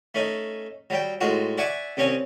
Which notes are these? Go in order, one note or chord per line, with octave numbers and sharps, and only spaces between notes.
A3 C#4 D#4
F#3 G3 G5
A2 G#3 F4 F#4
D5 E5 F#5 G#5 C#6 D6
C2 C4 C#4 C#5 G#5